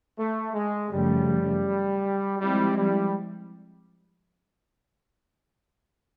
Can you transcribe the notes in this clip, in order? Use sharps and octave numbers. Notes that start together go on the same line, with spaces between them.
A3
G#3
F#2 C#3 F3 G3 A3
F3 G3 G#3 C4 E4
G3